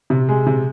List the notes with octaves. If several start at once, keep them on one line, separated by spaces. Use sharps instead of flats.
C3
G#3
C3